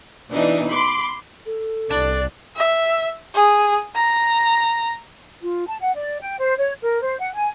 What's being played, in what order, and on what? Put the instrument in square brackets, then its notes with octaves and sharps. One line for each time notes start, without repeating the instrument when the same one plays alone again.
[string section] B2 E3 D4 D#4
B5 C6 D6
[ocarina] A4
[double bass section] C2 [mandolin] D4 [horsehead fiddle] D5
[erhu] E5
G#4
A#5
[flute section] F4
A5
F#5
D5
G5
C5
C#5
A#4
C5
F#5
G#5